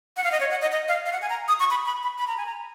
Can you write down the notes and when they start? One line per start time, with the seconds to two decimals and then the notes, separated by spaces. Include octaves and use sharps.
0.17 F#5
0.24 F5
0.32 D#5
0.40 C#5
0.51 F#5
0.62 D#5
0.72 D#5
0.88 F5
1.06 F5
1.13 F#5
1.22 G#5
1.30 A#5
1.48 D#6
1.60 C#6
1.71 B5
1.86 B5
2.03 B5
2.18 B5
2.27 A#5
2.37 G#5
2.46 A#5